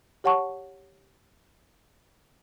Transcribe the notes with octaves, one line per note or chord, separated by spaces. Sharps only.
G4 C#5 F#5 A5 C#6